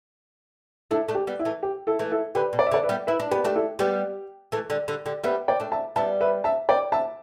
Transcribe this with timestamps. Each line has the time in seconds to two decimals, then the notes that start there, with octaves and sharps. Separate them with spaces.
0.91 A3 D4 E4 A4
1.08 A3 D4
1.15 G4
1.27 G3 B3
1.39 E4
1.45 E3 A3
1.63 G4
1.87 E4 A4
1.99 E3 A3
2.12 E4 A4
2.35 D3 G4 B4
2.53 B2
2.59 D5
2.67 E5
2.71 D3 A4 D5
2.84 B4 E5
2.89 G3 B3
3.07 E4 B4 E5
3.20 D4
3.31 B3 G4 B4
3.44 A3 D4 G4
3.56 E4 A4
3.79 G3 B3 G4
4.52 E3 A3
4.70 D3 G3
4.88 D3 G3
5.06 D3 G3
5.24 G3 B3 B4 E5
5.48 D5 G5
5.60 A3 D4
5.72 E5 A5
5.96 G3 B3 E5 A5
6.21 B4 E5
6.44 E5 A5
6.69 D5 G5
6.92 E5 A5